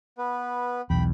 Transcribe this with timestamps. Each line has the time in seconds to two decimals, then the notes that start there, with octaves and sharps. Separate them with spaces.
0.18 B3 B4
0.90 B1 E2 G5 B5